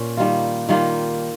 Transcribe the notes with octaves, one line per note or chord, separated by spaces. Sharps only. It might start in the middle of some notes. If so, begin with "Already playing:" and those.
Already playing: A#2 C#4
D#3 G3 A#3 F4
D#3 G3 A#3 F4